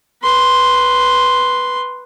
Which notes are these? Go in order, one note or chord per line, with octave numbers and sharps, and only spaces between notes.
B4 C6